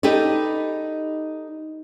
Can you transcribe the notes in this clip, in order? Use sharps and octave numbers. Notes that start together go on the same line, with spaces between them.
D#4 G4 A4 B4 D5